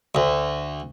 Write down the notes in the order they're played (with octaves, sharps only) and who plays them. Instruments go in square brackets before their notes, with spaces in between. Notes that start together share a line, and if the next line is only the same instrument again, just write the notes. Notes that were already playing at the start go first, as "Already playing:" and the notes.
[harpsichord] D2